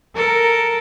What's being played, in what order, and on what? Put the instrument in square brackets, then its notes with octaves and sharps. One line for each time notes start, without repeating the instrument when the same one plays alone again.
[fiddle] A4 [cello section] A#4